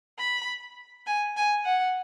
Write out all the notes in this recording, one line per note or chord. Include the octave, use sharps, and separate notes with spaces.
B5
G#5
G#5
F#5